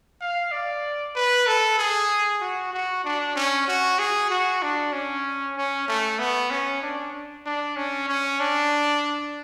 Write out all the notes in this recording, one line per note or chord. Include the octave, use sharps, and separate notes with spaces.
F5
D5
B4
A4
G#4
F#4
F#4
D4
C#4
F#4
G#4
F#4
D4
C#4
C#4
A3
B3
C#4
D4
D4
C#4
C#4
D4